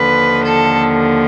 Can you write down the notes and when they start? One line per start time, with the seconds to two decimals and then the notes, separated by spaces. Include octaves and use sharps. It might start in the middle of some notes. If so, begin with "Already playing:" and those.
Already playing: D#2 D3 F3 B4
0.44 A4